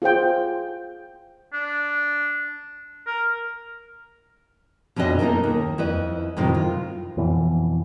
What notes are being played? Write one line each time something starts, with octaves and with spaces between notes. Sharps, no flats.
F4 G#4 C5 G5
D4
A#4
F2 B2 D3 C#4 D#5 E5
A#3 D#4 F4 A4 A#4
D#2
F2 E4 B4 D#5
F2 A2 C3 D#3 F#3
F4
F2 B2 E3